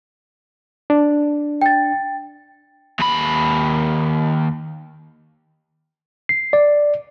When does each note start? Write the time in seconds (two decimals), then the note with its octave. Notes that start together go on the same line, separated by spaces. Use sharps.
0.90 D4
1.62 G5 A6
2.99 D#2 B5
6.29 C7
6.53 D5